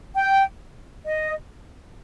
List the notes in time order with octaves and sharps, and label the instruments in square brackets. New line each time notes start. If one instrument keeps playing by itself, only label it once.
[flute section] G5
D#5